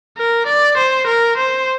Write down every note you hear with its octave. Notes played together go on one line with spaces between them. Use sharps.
A#4
D5
C5
A#4
C5